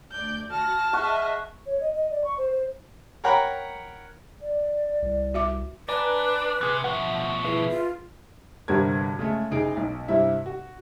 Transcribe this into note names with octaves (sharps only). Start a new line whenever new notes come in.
D2 D5 G6
F#4 A5 F6 A#6
G#4 D#5 E5 F#5 C#6
C#5
D#5
D#5
D5
C#6
C5
C5
A#4 C#5 F#5 G5 A#5 B5
D5
C2
F#4 E5 D6
D4 B4 D5 G#5 A#5
C3 G#4 F#6
B2 F3 E5 F#5
E4 G#4 B4 E5
F4
G1 G2 C3 F#4 A#4 G#6
C#3 G#3 A3
F#1 D#4 G#4 D7
B1
G2 C3 E4 E5
F#4